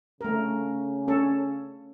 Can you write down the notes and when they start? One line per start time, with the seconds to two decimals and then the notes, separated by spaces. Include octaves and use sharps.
0.21 C#3 A3 A#4
1.08 C#4 A4